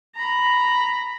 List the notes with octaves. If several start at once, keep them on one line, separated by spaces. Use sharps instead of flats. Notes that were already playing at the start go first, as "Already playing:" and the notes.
A#5 B5